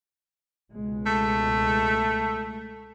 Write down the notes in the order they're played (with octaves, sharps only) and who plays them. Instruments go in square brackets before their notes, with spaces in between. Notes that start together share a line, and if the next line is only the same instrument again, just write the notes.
[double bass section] C#2 B2 G#3
[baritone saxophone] A3